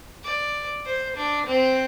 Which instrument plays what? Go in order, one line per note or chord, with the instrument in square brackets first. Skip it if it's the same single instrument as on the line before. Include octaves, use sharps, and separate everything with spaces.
[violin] D5
C5
D4
C4